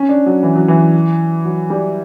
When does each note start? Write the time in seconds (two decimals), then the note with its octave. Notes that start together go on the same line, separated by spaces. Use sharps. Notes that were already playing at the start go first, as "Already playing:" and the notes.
Already playing: C#4
0.09 D4
0.26 F#3
0.43 E3
0.55 F#3
0.68 E3
1.45 F#3
1.70 G3